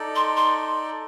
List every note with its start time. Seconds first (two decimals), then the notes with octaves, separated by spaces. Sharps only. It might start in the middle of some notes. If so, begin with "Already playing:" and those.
Already playing: D#4 A4 D5
0.16 C6
0.37 C6